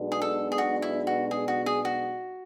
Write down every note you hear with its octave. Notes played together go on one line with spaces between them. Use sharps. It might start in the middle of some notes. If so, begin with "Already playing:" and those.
Already playing: B1 B2 G#3 B3 D4
G#4
A4
G#4
F#4
E4
F#4
G#4
F#4
G#4
F#4